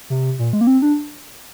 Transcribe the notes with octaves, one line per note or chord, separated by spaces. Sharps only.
C3
A#2
G#3
A#3
C4
D4